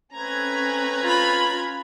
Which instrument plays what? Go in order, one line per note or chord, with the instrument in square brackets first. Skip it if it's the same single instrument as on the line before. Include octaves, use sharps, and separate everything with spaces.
[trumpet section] A3 C4 B4 [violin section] C#4 A#5 G#6
[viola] F4 B5